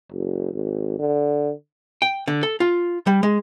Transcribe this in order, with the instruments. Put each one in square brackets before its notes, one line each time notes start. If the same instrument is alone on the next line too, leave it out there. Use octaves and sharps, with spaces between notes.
[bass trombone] F#1
G#1
D3
[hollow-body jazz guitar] G5
D3
A4
F4
G3
G#3